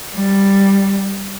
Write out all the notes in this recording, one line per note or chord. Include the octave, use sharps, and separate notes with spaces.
G3